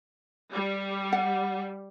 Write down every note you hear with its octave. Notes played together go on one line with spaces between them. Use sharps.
G3
F#5